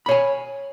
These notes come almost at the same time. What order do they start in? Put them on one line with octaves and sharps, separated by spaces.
B5 C#5 G#5